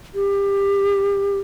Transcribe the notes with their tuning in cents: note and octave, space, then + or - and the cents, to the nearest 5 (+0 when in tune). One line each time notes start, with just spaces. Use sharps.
G4 +25